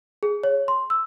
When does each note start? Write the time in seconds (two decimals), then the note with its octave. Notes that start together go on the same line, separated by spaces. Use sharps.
0.23 G#4
0.44 C#5
0.68 C6
0.90 E6